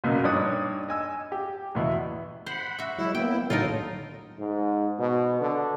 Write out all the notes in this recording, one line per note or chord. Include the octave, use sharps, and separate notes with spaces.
A#1 F#2 B2
G2 D#4 C#5 D5 D#6 F#6
D#5 G#5 E6
G4
E2 B2 E4
C5 F#5 B5
F#4 E5
F#3 G#3 E4
A#3 B3 E4 G5
A2 D3 F#3 D#4 F4 A4 A#4
G#2
B2
D3